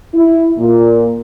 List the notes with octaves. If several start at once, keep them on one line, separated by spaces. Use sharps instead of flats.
E4
A#2